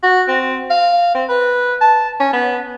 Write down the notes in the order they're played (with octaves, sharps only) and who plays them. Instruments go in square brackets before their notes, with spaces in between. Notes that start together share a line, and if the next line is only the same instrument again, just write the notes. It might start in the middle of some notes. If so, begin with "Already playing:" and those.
[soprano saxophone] F#4
C4
F5
C4
B4
A5
C#4
B3